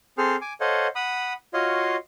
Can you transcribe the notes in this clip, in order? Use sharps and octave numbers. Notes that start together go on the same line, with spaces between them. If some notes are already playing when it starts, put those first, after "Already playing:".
C4 G#4 A4 C5 C6 F6
G#5 D6
A4 C5 C#5 D#5 F5 F#5
F#5 B5 D#6
F4 F#4 C#5 D#5 F5 C6